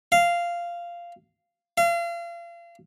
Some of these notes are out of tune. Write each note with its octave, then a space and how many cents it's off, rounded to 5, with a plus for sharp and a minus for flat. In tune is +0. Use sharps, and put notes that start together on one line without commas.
F5 -10
F5 -35